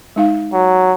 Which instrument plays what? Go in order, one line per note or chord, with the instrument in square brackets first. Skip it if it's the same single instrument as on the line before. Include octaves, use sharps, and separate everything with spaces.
[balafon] G#3 D#4 F5
[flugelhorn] F#3